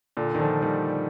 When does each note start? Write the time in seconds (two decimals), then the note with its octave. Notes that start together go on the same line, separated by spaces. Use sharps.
0.17 A#2 D3
0.35 D#3
0.40 D3 F3
0.62 D#3 G3